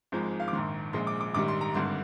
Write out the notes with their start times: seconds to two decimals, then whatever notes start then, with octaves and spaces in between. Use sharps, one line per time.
0.12 G#1 G#2 F3 G#3
0.40 F5
0.48 D6
0.53 A#1 G#2 D#3 C6
0.93 A#1 A#2 F3 G#3 C6
1.07 D6
1.21 D6
1.34 A#1 G#2 D#3 G3 D6
1.48 C6
1.61 A#5
1.74 G#1 G2 D3 C6